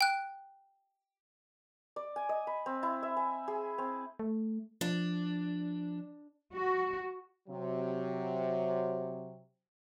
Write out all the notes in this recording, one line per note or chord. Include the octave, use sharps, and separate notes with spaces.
G5 F#6
D5
G#5
D#5
B5
C4
E4
E5
G#5
G#4
C4
A3
F3 D4
F#4
C3 F#3